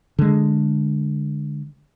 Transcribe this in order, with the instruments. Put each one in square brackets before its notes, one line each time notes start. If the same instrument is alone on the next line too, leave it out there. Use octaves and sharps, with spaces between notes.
[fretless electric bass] D3 G#3